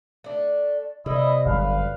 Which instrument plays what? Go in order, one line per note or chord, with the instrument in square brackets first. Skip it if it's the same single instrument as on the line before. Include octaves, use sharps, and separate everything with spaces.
[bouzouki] A3 D4
[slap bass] C3 [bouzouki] G3 [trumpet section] E4 D#5
[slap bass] G1 F#2 [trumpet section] B4 F5